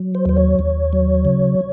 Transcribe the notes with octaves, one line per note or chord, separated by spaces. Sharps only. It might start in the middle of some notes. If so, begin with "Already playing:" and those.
Already playing: F#3
C5
D#2 C5
C#5
D#2
F#3
C#3